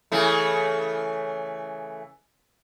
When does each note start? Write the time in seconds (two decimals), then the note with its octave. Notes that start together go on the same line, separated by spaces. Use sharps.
0.12 C#3 E3 A3